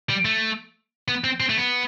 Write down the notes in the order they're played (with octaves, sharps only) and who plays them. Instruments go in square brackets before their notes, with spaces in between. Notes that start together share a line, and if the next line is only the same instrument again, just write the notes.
[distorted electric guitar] G3
A3
B3
C4
C4
A3
B3